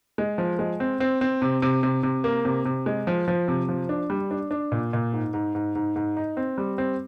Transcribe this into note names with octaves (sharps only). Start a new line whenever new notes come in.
G#3
F3
G#3
C4
C4
C4
C3
C3
C3
C3
A#3
C3
C3
G#3
F3
F3
C3
F3
D4
G3
D4
D4
A#2
A#2
G#2
G#2
G#2
G#2
G#2
D#4
C4
G3
C4